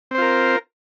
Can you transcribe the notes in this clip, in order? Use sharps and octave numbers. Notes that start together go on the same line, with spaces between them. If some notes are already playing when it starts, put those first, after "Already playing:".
C4 F4 A#4 C5